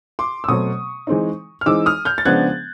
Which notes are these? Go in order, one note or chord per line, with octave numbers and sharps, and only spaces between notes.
C6 D6
E6
B2 F#3 A3 C4 C#6 D#6
E3 G#3 C4 D#4
F6
E3 G#3 C4 D#4 D6 E6
D#6 F6
F6 G6
A6
C#3 F3 G#3 B3 D4 F#6 G#6